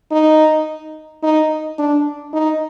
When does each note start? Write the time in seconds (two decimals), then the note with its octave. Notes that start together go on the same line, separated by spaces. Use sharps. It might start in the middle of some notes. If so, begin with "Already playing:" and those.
0.12 D#4
1.23 D#4
1.79 D4
2.33 D#4